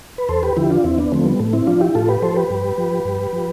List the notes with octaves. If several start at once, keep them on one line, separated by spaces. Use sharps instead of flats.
B4
E2 A4 C5
G4 B4
D3 F3 E4 G4
D4 F4
E2 C4 E4
B3 D4
D3 F3 A3 C4
G3 B3
A2 A3
C4 E4
F3 D4 F4
E4 G4
A2 F4 A4
G4 B4
F3 A4 C5
G4 B4
G2
F3
G2
F3